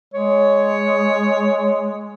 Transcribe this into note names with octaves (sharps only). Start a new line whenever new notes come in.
G#3 C#5